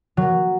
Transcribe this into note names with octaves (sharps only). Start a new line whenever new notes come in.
F#3